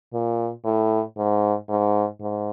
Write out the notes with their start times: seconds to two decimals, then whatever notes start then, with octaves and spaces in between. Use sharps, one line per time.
0.13 A#2
0.65 A2
1.17 G#2
1.69 G#2
2.21 G#2